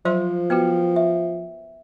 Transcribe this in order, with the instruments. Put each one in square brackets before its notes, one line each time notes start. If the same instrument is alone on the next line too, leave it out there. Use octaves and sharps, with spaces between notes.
[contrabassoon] F3 [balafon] F#3 E5 C6 [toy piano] C5
[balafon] B3 F#4 [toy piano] B4 G5
[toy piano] E5